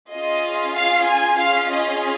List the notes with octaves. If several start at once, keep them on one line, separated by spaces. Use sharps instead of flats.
C#4 F4 G#4 D#5
F5
G#5
C#4 F4 G#4 F5
D#5